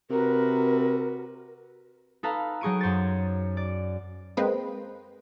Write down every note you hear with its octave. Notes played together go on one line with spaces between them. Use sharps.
C3 F#4 A#4 B4
D#4 A4 B4 F5 A#5
F#3 D#4 G#4 C#6 D7 D#7
F#2 C5 C#5 A6
D5
G#3 A#3 C4 B4 C5 D#5